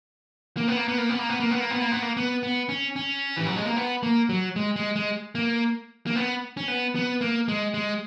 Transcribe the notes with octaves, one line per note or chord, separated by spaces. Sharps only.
A#3
B3
A#3
B3
A#3
B3
A#3
B3
A#3
B3
A#3
B3
A#3
B3
A#3
B3
B3
C#4
C#4
E3
F#3
G#3
A#3
B3
A#3
F#3
G#3
G#3
G#3
A#3
A#3
B3
C#4
B3
B3
A#3
G#3
G#3